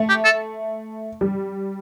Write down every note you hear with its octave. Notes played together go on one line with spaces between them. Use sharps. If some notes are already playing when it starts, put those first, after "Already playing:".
Already playing: A3
G4
A4
G3